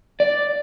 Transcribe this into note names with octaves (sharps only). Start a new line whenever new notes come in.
D5